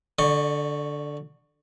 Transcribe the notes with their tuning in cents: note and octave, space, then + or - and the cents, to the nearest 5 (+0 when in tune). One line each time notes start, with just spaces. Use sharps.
D3 +0 D5 +40 C#6 +0